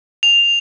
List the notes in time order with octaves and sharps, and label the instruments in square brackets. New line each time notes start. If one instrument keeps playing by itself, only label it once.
[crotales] F7